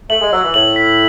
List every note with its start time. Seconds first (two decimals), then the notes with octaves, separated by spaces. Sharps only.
0.10 A3 F#7
0.21 G#3
0.33 F#3 E6
0.43 E3
0.54 A2 F#7
0.76 B6